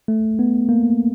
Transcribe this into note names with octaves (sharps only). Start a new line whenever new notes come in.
A3
B3
A#3